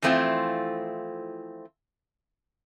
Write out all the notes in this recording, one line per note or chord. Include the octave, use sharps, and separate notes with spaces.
E3 F3 A3 C4 E4 F4